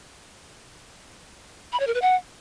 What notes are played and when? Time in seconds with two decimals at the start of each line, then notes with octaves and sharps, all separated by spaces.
1.72 B5
1.80 C#5
1.87 A#4
1.94 B4
2.02 F#5